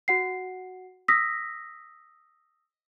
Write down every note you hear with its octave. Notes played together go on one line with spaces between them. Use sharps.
F#4 F#5 C7
D#6 E6 A#6 B6